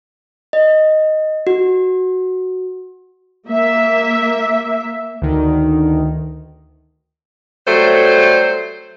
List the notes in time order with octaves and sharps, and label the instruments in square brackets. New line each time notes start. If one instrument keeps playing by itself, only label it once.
[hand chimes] D#5
F#4
[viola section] A#3 E5
[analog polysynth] D2 D#3
[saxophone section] F#3 G3 A3 C5